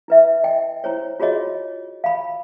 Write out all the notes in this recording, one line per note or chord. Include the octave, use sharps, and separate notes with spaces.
E4 B4 E5
D#5 G5
E4 C5 C#5
F4 F#4 G#4 C#5 D#5
F5 B5